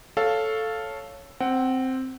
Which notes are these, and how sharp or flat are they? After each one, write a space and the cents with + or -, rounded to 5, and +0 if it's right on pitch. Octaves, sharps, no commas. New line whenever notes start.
A4 +0 C#5 +0 F5 +0
C4 +0 F#5 +25